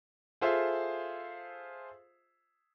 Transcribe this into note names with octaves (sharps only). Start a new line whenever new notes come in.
F4 G#4 A4 C5 E5 F5